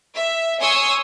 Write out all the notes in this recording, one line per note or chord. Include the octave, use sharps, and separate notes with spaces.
E5
C#5 G#5 C6 C#6 D#6 E6